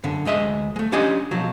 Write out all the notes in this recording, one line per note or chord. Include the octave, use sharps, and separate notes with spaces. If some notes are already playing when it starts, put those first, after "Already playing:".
F#2 D3
D2 G#3 D#5 E5
G#3 A3
C#4 D4 G4 D#5 G#5 C6
B1 F3 F#3